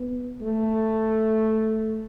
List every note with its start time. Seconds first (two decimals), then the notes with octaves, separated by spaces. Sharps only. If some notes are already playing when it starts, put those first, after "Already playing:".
Already playing: B3
0.41 A3